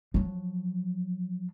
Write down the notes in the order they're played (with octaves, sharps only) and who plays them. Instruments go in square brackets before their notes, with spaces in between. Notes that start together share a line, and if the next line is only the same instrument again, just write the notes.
[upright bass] F3 F#3